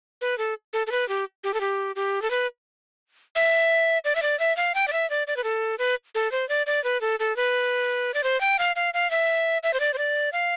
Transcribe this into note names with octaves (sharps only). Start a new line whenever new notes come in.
B4
A4
A4
A4
B4
G4
G4
A4
G4
G4
A4
B4
E5
D5
E5
D5
E5
F5
G5
D5
E5
D5
D5
B4
A4
B4
A4
C5
D5
D5
B4
A4
A4
B4
D5
C5
G5
F5
F5
F5
E5
E5
C5
D5
C5
D5
F5